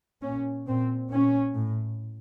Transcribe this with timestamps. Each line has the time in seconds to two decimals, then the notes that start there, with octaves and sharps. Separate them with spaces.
0.22 A#2 C#4
0.66 A#2 C4
1.09 A#2 C#4
1.54 A2